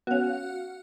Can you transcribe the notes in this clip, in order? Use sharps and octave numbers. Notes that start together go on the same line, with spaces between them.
B3 C#4 F#4 F5